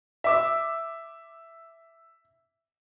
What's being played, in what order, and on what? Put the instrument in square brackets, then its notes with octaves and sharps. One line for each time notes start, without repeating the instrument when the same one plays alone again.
[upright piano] E5 D6 E6